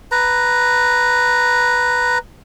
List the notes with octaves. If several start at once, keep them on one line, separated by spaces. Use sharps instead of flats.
B4 A#5